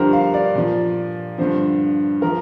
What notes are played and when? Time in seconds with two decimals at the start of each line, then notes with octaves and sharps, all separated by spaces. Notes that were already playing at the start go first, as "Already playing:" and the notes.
Already playing: G2 D3 F3 G4 A#4 C5
0.13 F5
0.34 D5
0.55 A#2 F3
1.38 G2 D3 F3 C5
2.22 F3 A#4